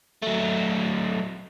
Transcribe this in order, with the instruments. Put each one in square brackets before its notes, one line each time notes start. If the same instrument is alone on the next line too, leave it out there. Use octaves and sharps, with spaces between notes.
[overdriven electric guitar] F#3 A3